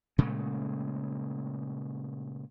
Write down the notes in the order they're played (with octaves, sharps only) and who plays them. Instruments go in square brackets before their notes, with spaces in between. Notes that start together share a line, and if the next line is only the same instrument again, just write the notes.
[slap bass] A#2 C#3 G#3 A3